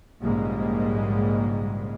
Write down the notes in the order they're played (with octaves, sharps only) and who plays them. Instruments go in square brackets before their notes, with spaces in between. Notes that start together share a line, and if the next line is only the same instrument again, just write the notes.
[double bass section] A#1 G#2 C#3 G3 G#3 A#3